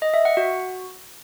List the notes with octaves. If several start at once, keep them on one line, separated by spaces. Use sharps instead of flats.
D#5
E5
F#5
F#4